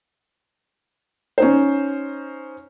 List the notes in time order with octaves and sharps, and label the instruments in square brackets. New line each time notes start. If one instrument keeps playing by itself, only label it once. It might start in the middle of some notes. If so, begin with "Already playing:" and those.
[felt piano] C#4 D#4 C5